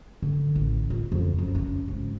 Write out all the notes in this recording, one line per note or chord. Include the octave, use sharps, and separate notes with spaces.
D3
A1
F4
F2
F#2
C#4
G#1